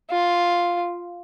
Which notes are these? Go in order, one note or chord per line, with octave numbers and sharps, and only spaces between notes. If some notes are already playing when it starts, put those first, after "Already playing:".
F4